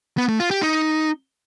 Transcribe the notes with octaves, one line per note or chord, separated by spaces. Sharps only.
B3
A3
F4
G4
D#4